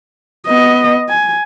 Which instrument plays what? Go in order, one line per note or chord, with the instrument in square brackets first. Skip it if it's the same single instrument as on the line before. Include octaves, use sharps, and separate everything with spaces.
[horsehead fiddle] B3 D#5
G#5